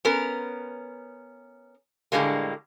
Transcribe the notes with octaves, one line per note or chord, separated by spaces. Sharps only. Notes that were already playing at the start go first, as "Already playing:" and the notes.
B3 C#4 A#4
A2 D3 G3 G#3 A#3